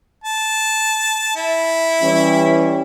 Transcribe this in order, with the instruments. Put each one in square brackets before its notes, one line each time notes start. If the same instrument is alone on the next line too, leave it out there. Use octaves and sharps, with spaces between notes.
[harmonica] A5
E4
[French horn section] E3 G3 C#4